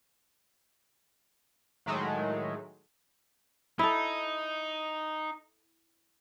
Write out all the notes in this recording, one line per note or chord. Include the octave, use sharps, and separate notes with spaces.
A2 D#3 F#3 G#3 A3
D#4 E4 A4